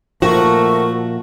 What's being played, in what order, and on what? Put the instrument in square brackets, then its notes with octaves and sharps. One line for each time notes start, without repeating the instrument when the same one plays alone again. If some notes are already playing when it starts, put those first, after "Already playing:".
[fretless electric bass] A#2 F3 [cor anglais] A3 [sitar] F#4 [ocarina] A#4